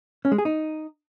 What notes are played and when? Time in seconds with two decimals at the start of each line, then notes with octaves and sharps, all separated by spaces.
0.25 C#4
0.32 G#3
0.38 G#4
0.45 D#4